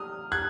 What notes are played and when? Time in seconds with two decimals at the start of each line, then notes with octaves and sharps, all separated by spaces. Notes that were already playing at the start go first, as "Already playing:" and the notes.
Already playing: D#6 F6
0.32 F#6 G#6